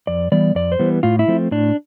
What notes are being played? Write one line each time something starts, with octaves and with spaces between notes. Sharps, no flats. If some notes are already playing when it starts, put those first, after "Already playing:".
F2 D5
E3 G3 B3 D5
F2 D5
C5
E3 G3 B3
A2 F4
E4
F3 A3 C4
A2 D4